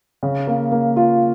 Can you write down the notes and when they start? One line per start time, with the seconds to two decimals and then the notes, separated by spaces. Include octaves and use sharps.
0.23 C#3
0.47 A#3
0.72 A#3
0.97 F4